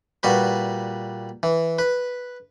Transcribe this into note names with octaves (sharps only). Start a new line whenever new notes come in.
A#2 G3 F#4 B4
E3
B4